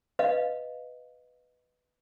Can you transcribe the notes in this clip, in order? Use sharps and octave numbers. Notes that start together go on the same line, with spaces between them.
B4 D#5 F5